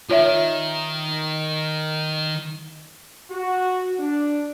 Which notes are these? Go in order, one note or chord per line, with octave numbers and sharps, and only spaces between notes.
D#3 F4 C#5 E5
F#4
D4